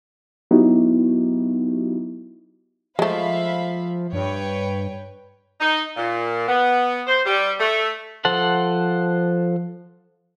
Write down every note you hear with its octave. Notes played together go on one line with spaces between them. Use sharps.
F#3 B3 D#4 E4 F#4 G4
F3 G#3 A3 E5 F5 B5
G2 B4 C#5 G5
D#4
A#2
B3
C5
G3
A3
F3 A4 C5 F#5 A5